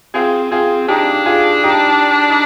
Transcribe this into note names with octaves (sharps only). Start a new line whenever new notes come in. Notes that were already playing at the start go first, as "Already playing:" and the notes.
C4 F4 G#4
C4 F4 G#4
D4 D#4 G4
F4 G#4
D#4 G4
D#4